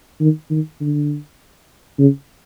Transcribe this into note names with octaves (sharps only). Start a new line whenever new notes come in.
D#3
D#3
D3
C#3